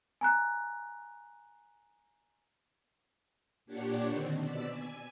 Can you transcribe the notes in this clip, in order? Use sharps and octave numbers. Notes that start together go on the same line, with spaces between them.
G#5 A#5 F#6
A#2 D4 G4 C#5 D5 F#5
D3 D#3 C4
B2 D5 E6 B6
G#5 G#6